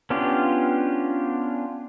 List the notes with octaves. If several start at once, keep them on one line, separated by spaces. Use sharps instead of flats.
B3 C#4 D4 F4 G4